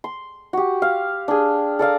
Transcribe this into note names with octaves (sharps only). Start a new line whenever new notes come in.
C6
F#4 G4
F5
D4 G#4
A4 D5 F5 A#5